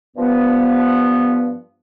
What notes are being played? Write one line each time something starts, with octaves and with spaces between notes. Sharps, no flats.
G2 F3 B3